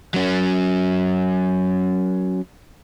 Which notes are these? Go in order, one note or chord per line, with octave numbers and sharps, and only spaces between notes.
F#3 C#4